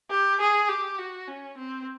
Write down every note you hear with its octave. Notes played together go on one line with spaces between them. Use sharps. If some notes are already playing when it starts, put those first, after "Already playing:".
G4
G#4
G4
F#4
C#4
C4